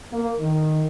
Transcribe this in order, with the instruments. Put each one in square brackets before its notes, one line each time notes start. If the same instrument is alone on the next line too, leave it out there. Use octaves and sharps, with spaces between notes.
[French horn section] A#3
D#3